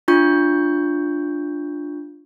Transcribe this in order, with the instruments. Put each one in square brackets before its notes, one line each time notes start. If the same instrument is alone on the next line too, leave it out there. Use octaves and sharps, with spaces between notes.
[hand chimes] D4 F4 C#6 G6